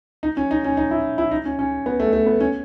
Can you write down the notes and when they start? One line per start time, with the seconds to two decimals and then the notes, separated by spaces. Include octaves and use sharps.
0.23 D#4
0.37 C#4
0.51 D#4
0.64 C#4
0.77 D#4
0.91 E4
1.18 E4
1.31 D#4
1.45 C#4
1.59 C#4
1.86 B3
2.00 A3
2.13 A3
2.26 B3
2.40 C#4